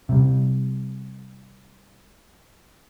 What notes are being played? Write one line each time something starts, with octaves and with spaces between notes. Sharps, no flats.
C3 G3